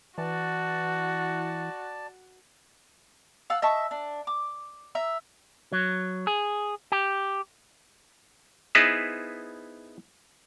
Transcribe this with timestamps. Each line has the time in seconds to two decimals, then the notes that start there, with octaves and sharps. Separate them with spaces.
0.18 E3 F#4 D5 A5
3.50 F5 F#5 A5 E6
3.62 D#5 E5 A5 C#6
3.91 D4
4.27 D6
4.95 E5 A#5 E6
5.72 F#3
6.27 G#4
6.92 G4
8.75 B3 D#4 E4 G#4 B4 C5